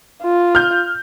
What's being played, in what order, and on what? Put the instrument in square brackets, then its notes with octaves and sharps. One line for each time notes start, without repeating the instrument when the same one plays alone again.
[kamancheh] F4
[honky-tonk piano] F6 G6